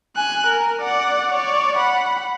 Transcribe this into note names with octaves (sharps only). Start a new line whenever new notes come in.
G#5 F#6
A#4
D5 F#5
C#5 D5
F#5 B5